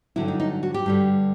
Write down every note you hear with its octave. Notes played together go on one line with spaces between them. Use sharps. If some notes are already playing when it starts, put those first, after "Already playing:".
G2 D3 F#3 E4
D#4
D#4
F#4
G4
G2 D3 G3